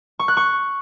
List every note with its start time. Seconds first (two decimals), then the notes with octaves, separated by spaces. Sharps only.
0.19 C#6
0.28 F#6
0.37 C#6